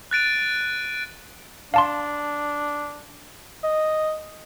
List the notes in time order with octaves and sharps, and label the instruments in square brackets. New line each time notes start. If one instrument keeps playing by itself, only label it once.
[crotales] F#6 A6 D7 D#7
[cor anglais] D4 [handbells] F5 A5 C6
[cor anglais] D#5